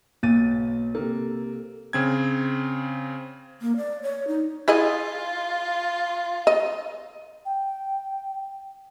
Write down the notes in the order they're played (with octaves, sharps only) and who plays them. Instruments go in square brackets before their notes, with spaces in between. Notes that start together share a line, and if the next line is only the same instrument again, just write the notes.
[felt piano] B1 A6 D#7 [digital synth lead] A#3
[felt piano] C3 A#3 [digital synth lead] A4
[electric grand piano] C#3 C4 G#6
[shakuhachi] A#3
D5
C#5
D#4
[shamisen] E4 G#4 D#5 [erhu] F4
[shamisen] D#5
[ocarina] G5